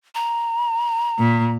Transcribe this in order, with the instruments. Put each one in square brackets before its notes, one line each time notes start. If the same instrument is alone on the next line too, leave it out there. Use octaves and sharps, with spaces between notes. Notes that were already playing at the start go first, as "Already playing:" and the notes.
[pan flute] A#5
[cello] A#2